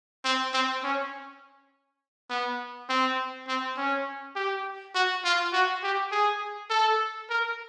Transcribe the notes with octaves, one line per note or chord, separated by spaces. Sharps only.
C4
C4
C#4
B3
C4
C4
C#4
G4
F#4
F4
F#4
G4
G#4
A4
A#4